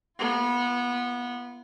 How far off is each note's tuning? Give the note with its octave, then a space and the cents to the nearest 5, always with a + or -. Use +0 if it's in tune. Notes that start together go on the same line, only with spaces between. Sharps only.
B3 -20 F4 -45